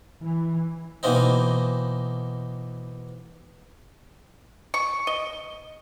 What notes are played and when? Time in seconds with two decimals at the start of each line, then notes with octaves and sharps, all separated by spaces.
0.22 E3
1.03 B2 E3 A#3 C4 D#4
4.74 C#6
5.07 D#5